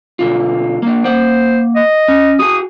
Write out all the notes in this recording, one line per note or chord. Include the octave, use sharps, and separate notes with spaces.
B2 D3 F4
A#3 D4
A#3 C5 F#5
D#5
C#4
F#4 G#4 D#6